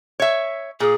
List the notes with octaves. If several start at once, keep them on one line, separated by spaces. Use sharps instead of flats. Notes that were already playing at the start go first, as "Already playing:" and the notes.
C#5 E5
A#2 G#4